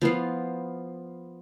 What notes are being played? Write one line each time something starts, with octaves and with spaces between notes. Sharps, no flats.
F3 B3 F4